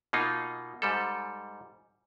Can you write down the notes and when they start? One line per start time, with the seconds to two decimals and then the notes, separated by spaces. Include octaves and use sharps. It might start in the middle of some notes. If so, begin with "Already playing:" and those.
0.13 B2 A#3 D#4 F4
0.82 G#2 G3 A4